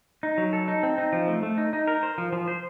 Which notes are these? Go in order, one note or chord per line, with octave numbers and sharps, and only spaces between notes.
D#4
F#3
A4
D#4
C4
D#4
F3
A3
A3
D#4
D#4
A#4
C5
F3
F3
C5